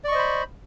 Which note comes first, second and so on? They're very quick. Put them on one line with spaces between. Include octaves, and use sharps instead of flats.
D5 C#6 D#5 C5 B5